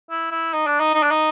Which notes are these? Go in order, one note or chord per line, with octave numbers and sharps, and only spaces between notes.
E4
E4
D#4
D4
D#4
D#4
D4
D#4